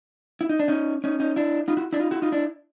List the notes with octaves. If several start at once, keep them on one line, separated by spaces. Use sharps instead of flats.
E4
D#4
D4
C#4 D#4
C#4 D#4
C#4 D#4
D4 E4
D#4 F4
E4 F#4
D4 E4
D#4 F4
E4 F#4
D#4 F4
D4 E4